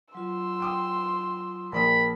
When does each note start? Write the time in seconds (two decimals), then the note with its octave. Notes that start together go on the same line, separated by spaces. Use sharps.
0.15 F#3 F4 C6 E6
0.60 G5 D6 D#6
1.72 A#1 A#4 D5 G5 A5 B5 D#6